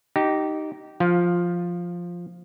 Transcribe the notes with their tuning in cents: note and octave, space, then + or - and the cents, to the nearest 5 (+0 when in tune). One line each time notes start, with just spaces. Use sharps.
D#4 +0 G4 -20
F3 +0 F5 +20